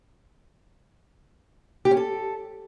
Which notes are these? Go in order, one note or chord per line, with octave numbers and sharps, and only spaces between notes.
G4
C#4
A4